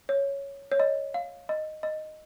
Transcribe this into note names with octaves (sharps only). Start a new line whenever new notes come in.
C#5
C#5
D#5
F5
D#5
D#5